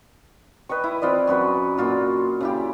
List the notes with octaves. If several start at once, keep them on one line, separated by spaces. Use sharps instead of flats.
B4 D#5 G5 C#6
E4
C4 F4 D5 D#5
F#2 F#4 B4 B5
A#2 F4 F#4
C#3 E4 G4